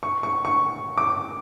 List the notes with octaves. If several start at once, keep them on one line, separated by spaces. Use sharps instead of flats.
C#6
C#6
C#6
D6